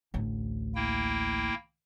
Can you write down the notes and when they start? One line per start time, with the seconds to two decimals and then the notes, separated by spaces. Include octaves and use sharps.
0.14 A1 D2
0.75 A#3 E4 G5